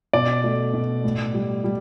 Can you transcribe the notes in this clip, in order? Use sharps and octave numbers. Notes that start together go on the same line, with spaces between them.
B2 D5
A3
B2
A2
G3
G3